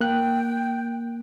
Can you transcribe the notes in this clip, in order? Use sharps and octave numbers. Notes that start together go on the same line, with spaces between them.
A#3 G5 F#6